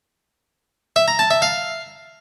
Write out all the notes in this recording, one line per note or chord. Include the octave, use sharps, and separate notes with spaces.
E5
A#5
A5
E5
F5